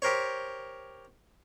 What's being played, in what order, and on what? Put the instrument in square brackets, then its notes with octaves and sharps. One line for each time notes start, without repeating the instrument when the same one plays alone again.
[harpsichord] G4 A#4 C5 C#5